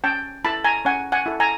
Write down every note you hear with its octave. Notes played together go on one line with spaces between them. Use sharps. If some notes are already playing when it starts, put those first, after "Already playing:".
C#4 G5 A5
E4 A4 A5 B5
G#5 A#5
C#4 F#5 G#5
F#5 G#5
E4 A4
G#5 A#5